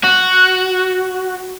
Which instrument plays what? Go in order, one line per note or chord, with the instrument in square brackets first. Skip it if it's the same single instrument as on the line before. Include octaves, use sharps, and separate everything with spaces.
[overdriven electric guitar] F#4